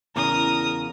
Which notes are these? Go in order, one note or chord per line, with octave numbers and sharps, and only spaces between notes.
E2 C#3 A#4 D#6